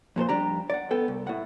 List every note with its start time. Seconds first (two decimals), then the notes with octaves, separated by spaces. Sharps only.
0.16 F2 A#2 A4 C5
0.29 F2 G3 D4 G4 A#5
0.70 D5 F#5
0.91 B3 A4 G5
1.08 C2
1.27 A2 A3 F#5